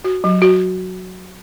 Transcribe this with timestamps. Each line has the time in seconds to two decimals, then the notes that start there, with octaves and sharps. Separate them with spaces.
0.04 F#4
0.24 F#3
0.42 F#4